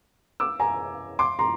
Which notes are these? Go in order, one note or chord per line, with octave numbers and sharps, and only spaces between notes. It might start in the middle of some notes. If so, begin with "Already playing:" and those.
D6 E6
G#5 A#5
C6 D6
A#5 C6